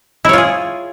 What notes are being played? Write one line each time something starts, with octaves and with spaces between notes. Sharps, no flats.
E4 F4 G#4 C#5